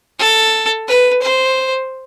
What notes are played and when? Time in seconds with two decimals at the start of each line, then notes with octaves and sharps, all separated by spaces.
0.19 A4
0.88 B4
1.22 C5